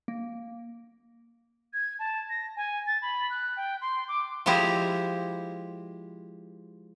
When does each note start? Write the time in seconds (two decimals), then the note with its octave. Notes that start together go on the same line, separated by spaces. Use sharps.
0.08 A#3
1.73 G#6
1.99 A5
2.29 A#6
2.56 G#5
2.86 A6
3.02 B5
3.30 F#6
3.57 G5
3.81 C6
4.08 D6
4.46 F3 G#3 E4 G4 C5 A#5